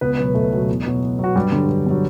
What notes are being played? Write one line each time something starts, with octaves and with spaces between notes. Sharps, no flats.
C#2 B3 B4
B2 F#3
C#2 A3 A4
B2 F#3
E2
B2 F#3
E2
B2 F#3 F#4
G2 G3 G4
D3 F#3
G2
D3 F#3